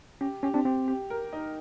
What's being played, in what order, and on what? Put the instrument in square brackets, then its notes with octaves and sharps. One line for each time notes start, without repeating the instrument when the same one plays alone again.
[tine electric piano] C#4 [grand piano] G4
[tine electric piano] C#4 [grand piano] G4
[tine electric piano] C4 D4
[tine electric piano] C4 [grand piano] G4
[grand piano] G4
A#4
D#4